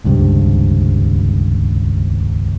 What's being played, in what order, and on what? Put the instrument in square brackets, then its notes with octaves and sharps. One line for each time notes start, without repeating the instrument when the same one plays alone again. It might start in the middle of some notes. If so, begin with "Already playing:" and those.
[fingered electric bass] D#1 C#2 G2 C3